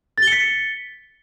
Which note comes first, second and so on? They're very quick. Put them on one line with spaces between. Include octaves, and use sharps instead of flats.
A6 G7 C#7 B6